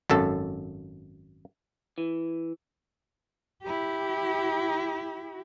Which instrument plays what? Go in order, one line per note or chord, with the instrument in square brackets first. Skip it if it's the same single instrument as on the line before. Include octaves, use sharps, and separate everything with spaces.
[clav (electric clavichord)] G#1 F#2 A4
[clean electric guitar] E3
[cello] E4 G4